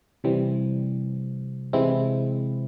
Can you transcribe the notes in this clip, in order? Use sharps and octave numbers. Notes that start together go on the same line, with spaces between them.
C3 E3 G3 C4
C3 E3 G#3 C4 E4